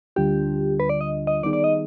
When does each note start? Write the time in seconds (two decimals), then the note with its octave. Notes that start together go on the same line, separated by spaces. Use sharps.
0.16 D2 D3 G3 D4 F4 G4
0.80 B4
0.90 D5
1.01 D#5
1.27 D#5
1.43 D#3 G3 B3 D#4 G#4 D5
1.53 D5
1.64 D#5